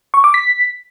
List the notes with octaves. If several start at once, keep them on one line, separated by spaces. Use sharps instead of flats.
C#6
D6
B6